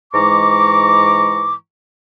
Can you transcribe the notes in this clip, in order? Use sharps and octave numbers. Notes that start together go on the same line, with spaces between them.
G#2 E3 G#3 A#5 C#6 D6